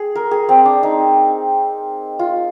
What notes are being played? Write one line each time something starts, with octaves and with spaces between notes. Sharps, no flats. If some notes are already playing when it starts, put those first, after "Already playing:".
Already playing: G#4
A#4
G#4
C4
D4
D#4
F4